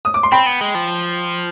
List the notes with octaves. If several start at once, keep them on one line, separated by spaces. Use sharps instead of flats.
D#6
D6
C6
C4 G5 B5
B3
G#3
F3